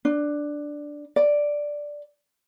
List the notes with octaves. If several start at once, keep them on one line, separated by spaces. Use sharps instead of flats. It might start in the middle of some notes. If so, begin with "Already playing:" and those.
D4
D5